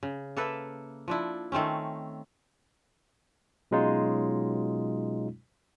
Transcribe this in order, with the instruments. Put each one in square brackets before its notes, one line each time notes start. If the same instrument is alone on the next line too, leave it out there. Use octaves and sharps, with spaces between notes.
[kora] C#3
A#3 A4 B4 E5
F3 D4 E4
D#3 A3 C4 C#4
[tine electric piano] B2 F#3 G#3 C#4 D#4 F4